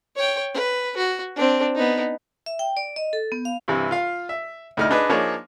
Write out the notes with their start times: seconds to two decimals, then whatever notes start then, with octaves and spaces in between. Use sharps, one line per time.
0.16 C#5 G5
0.54 B4
0.97 F#4
1.36 C4 D4
1.75 B3 D#4
2.46 E5
2.59 G5
2.77 D5
2.96 D#5
3.13 A4
3.32 B3
3.45 F5
3.68 G2 C3 E3
3.91 F4 F5
4.29 E5
4.77 D2 A3 D#4 E4 F6
4.91 D4 D#4 G#4 B4
5.09 F3 A#3 D4 D#4 G#4 C#5